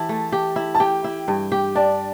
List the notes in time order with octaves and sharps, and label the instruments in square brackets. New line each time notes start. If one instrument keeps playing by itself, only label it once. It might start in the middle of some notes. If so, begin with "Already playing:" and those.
Already playing: [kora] E3 E4 G4 [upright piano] A5
[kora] A3
G4
E4
[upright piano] A5
[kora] G4 [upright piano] G5
[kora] E4
G2
G4
[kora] D4 [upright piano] D5